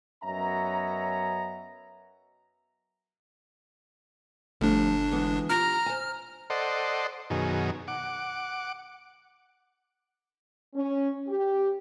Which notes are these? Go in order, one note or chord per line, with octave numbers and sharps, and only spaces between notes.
F#2 B3 C#4 D#5 E5 A#5
G1 F3 G3 A3 D4
E3 G#3 B3
F4 G4 A#5 F6
C5 G#5
A4 C5 D5 D#5 F#5 C6
F#2 B2 D#3 G#4
F#5 D6
C#4
G4